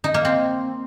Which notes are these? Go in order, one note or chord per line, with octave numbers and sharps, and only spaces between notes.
D#4
A#3
C4